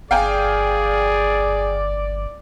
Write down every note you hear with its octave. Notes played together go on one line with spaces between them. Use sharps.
G1 G#4 D5 F5 G5 G#5